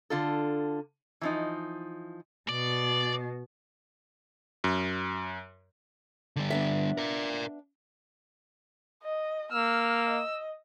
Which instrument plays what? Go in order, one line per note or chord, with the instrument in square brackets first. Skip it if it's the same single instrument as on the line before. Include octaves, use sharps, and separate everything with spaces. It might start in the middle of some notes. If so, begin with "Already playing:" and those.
[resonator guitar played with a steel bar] D3 F4 A4
E3 F3 D#4
[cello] B2 [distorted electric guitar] D5
[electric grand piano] F#2
[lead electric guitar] D3 G3
[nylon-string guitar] B3 D4 E5
[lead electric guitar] A#4 D5
[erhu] D#5
[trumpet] A#3 [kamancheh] E6 [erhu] F6
[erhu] D#5